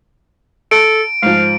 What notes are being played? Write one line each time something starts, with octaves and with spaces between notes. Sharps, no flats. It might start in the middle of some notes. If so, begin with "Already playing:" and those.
A4 A5 D7
G#2 F3 F5